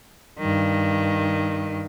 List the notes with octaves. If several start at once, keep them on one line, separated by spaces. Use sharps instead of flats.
G2 D#3